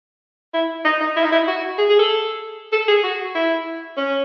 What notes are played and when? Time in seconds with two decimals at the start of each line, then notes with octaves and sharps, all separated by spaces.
0.54 E4
0.85 D#4
1.01 D#4
1.17 E4
1.24 D#4
1.32 E4
1.48 F#4
1.78 G#4
1.90 G#4
1.99 A4
2.73 A4
2.88 G#4
3.04 F#4
3.35 E4
3.97 C#4